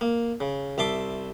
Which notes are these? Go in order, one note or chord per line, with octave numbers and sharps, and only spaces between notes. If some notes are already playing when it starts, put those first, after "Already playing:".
A#3
C#3
C2 E5 A5 C6 D6